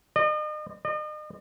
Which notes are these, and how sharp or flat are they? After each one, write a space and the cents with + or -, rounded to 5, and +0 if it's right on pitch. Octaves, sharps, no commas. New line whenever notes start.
D#5 -40
D#5 -40